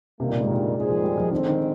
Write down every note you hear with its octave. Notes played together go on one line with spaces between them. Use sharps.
G2 C3 D#3 G3 A#3
A#2
G#2
A#2
A#2 G#3 D#4 G#4 C5
F3
G3
F3
F2 D3 D#3 G#3 C4
D#3